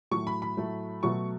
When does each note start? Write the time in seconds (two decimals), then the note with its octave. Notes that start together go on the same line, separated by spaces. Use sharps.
0.11 A2 F#3 A3 C#6
0.27 B5
0.42 B5
0.57 A2 F#3 A3
1.03 B2 F#3 A3 C#6